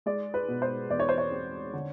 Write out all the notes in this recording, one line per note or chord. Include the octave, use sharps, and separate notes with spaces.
G#3 D5
B4
B2
C5
E2 D5
C#5
C5
C#5
C4
D3